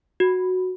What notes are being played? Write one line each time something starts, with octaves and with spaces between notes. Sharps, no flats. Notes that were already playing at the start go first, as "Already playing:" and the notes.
F#4